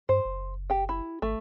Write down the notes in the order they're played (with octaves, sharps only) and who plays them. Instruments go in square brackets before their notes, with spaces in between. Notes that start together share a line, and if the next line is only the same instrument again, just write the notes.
[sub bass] G2 [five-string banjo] C5
[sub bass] F#1
[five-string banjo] G4 G5
E4
[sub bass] G#1 [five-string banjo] A3